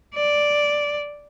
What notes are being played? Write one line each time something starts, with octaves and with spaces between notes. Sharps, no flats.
D5